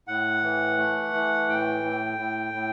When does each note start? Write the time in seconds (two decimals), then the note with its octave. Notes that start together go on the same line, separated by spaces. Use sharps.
0.07 A2 F#5
0.43 E3
0.78 A3
1.14 E3
1.49 A2 G5
1.84 A2
2.18 A2
2.54 A2